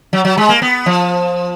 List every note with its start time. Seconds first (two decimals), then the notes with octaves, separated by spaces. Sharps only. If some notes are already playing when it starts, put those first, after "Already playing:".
0.13 F#3
0.25 F#3
0.38 G#3
0.49 A#3
0.62 B3
0.86 F3